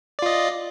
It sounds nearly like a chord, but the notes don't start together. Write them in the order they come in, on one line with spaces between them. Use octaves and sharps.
D5 F4 D#5